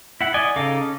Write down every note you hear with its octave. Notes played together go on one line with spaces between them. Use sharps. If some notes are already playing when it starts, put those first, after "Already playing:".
E4 F#5
D5 D#5 G#5
C#3 D#4 A4 F5 D6
C#4